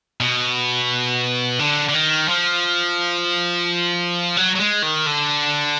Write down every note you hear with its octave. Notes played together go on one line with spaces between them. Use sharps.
B2
D3
D3
D#3
F3
F#3
F#3
G#3
D#3
D3